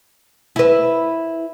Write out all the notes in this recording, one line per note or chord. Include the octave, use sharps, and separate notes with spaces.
E4 B4